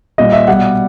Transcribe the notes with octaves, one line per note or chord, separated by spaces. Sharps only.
A#2 G3 D#5
E5
B2 G3 F#5